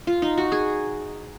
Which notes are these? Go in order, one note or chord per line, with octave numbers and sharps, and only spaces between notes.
F4
D#4
F#4
G#4